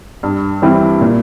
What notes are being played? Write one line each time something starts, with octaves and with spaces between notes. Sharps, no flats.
G2
E3 G3 C4 E4
A#2